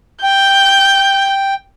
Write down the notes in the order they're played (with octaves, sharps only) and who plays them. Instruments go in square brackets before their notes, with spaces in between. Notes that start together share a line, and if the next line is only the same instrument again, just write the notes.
[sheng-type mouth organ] G5 [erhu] G6